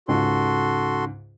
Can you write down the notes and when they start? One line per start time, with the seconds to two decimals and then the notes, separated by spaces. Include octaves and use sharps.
0.08 C#2 G#2 C#3 F#4 A4 C6